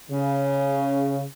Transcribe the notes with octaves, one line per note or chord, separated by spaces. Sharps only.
C#3